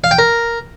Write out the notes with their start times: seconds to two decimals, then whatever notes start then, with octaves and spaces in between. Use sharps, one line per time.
0.04 F5
0.11 G5
0.19 A#4